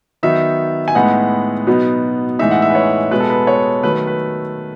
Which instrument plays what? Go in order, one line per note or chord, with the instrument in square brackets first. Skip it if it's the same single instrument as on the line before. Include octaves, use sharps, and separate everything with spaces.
[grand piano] D#3 F#3 B3 D#4 E5
G#5
A2 G#3 B3 D#4 F#5
B2 F#3 B3 D#4
A2 E3 G#3 D#4 E5
F#5
E5
B4
C#5
B2 G#3 B3 B4
A4
B4
C#5
D#3 F#3 A3 B4
B4